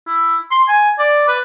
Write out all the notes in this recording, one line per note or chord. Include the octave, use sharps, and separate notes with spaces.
E4
C6
G#5
D5
B4